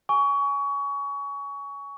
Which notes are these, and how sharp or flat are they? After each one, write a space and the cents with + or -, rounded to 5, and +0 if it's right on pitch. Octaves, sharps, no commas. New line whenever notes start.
G#5 +0 C#6 +25